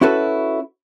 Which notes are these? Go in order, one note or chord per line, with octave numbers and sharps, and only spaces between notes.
C#4 E4 F#4 A4 B4